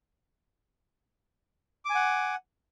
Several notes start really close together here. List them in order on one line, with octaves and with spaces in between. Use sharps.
D6 G#5 F#5